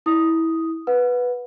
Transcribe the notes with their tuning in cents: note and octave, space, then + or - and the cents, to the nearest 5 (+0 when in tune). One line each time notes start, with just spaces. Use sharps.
E4 -20 D#6 +0
B4 +0 F#5 -25